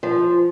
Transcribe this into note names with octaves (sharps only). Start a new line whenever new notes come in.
F3